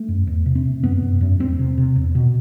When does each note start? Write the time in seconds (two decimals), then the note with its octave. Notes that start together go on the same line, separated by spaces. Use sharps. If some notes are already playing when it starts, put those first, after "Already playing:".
Already playing: A3
0.08 F#2
0.27 E2
0.46 C3
0.55 C4
0.65 C3
0.83 F#2 B3
1.02 F#2
1.21 F#2
1.39 E2 C4
1.59 C3
1.78 C3
1.96 E2
2.15 B2